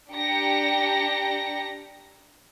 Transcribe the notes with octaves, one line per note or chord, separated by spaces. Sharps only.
D4 G4 G5 A#5 A#6 C#7